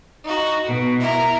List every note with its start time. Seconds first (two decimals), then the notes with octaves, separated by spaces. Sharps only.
0.23 D#4 F#4
0.66 B2
1.00 E4 A#4